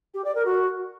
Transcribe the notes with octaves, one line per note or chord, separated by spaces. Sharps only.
G4
D5
A#4
F#4